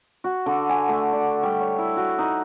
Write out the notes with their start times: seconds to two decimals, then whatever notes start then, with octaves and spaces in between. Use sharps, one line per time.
0.24 F#4
0.46 D3
0.69 G#5
0.88 A3
1.13 D5
1.43 G3
1.60 C#5
1.78 E4
1.97 F#4
2.19 D#4